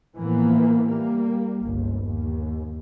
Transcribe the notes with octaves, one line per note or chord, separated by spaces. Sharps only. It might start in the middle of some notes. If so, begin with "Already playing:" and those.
A2 E3 F3 A#3 B3
G3 A#3
G1 C#2
D#2